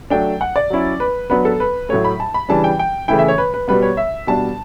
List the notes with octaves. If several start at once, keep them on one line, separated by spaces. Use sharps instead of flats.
F#3 A3 D4 G5
F#5
D5
F#3 C#4 E4
B4
F#3 B3 D4 B4
A4
B4
A2 F#3 A3 C#5
B5
A5
B5
C#3 E3 G3 D4 A5
G5
G5
C#3 E3 A3 E4 G5
E5
C#5
B4
B4
B2 G3 B3 B4
C#5
E5
B2 G3 D4 A5